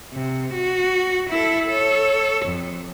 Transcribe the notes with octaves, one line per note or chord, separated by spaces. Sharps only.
C3
F#4
E4 A4
A4 C#5
F2